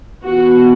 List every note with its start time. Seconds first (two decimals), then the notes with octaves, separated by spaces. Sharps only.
0.23 E3 B3 F#4